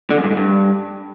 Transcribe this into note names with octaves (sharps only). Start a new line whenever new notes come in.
D3
F#2
G2
G#2
G2